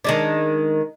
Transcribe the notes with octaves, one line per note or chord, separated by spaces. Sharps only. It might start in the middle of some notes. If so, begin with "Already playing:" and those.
D#3 G#3 D4